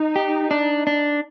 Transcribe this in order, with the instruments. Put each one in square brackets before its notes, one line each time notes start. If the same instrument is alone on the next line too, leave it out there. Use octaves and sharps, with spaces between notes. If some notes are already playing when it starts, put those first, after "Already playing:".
Already playing: [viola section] D#4
[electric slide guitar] G4
D4
D4